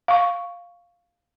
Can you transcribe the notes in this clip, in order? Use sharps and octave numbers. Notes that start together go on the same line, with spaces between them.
F5 C#6